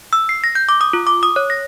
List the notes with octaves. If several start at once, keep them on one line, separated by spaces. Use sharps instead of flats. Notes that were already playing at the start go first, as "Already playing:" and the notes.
E6
C7
A#6
G6
D6
D#6
F4
D6
D#6
C#5
A#6